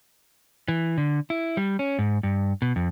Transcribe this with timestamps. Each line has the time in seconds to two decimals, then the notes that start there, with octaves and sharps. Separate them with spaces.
0.68 E3
0.98 D3
1.30 E4
1.57 G3
1.79 C#4
1.99 G#2
2.23 G2
2.62 B2
2.76 F2